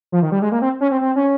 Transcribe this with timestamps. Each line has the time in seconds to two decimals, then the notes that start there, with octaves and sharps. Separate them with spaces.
0.12 F3
0.22 D#3
0.32 G3
0.42 G#3
0.52 A#3
0.62 C4
0.81 C#4
0.91 C4
1.01 C4
1.16 C#4